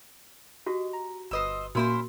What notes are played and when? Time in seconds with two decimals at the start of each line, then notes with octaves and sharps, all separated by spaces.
0.66 F#4 G4 D#5
0.93 A#5
1.31 G1 B4 C5 D#5 D#6 E6
1.75 A#2 A#3 C#4 E4 F#4 A#4 C5 C6